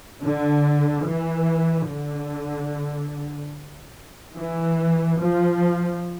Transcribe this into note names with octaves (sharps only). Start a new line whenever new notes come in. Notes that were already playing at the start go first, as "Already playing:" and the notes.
D3
E3
D3
E3
F3